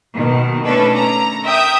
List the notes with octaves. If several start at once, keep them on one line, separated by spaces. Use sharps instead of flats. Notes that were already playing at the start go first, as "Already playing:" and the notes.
B2 D#3
A3 C#4 D4 A4 B4
A#5
A#4 E5 G5 D#6 G6